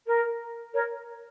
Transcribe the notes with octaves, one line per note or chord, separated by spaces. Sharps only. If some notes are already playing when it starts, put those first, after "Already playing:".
A#4
A#4 C#5